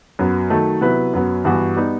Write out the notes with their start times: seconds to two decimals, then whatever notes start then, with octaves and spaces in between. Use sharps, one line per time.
0.19 F#2 F#3 B3
0.50 D#3 F#3 A3 D#4 A4
0.81 C3 F#3 B3 E4 B4
1.14 F#2 F#3 B3
1.45 G2 E3 B3 F#4
1.76 G3 B3 D#4